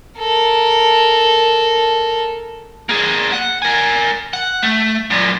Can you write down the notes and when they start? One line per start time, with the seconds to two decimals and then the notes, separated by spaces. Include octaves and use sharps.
0.18 A4 A#4
2.89 A#3 G#4
3.32 F#5
3.62 A#4 G#5
4.33 F#5
4.62 A3
5.10 F#2 A#2